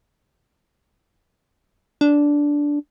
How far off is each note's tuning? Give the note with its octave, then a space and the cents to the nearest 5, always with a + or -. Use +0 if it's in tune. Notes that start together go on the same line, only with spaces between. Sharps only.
D4 -10